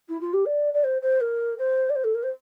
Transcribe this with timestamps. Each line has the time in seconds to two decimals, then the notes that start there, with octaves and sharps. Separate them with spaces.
0.08 E4
0.21 F4
0.33 G4
0.45 D5
0.74 D5
0.83 C5
1.01 C5
1.20 A#4
1.58 C5
1.89 D5
1.95 C5
2.04 A4
2.14 A#4
2.23 C5